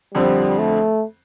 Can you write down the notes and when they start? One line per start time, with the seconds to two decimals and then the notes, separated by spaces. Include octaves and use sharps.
0.14 F2 D3 F3 G3 C4
0.59 A3